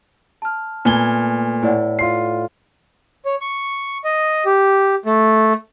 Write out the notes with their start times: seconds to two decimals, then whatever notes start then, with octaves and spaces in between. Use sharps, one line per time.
0.42 A5 F6
0.85 A#2 A3 B3 G#5 G7
1.62 A2 E4 D5 F#5
1.99 F4 C6 C7
3.25 C#5
3.41 C#6
4.04 D#5
4.46 G4
5.06 A3